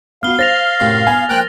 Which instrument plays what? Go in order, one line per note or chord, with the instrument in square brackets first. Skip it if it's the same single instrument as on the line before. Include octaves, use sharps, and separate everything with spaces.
[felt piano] B3 F#4 [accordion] F5 [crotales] F6 G7
[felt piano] C5 [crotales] A6 A#6 F7
[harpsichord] F#2 A2 C3
[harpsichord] B3 [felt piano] G#5
[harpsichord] F3 A#3 [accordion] G5 F#6